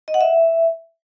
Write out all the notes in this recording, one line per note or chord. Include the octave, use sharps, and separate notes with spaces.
D#5
F#5
E5